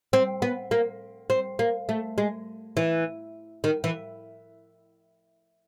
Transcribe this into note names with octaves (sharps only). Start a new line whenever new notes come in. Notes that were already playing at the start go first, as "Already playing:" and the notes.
C4
B3
A#3
C4
A#3
A3
G#3
E3
D#3
E3